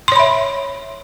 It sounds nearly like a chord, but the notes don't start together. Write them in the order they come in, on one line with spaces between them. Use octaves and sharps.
C6 C#5 B5 E5